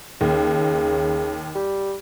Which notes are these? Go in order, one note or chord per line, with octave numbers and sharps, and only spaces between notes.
D#2 C#3
G3